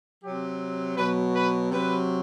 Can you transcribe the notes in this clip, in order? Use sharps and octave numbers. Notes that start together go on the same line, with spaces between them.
C3 F#3 G4
B2 F#3 B4
B4
C3 F#3 B4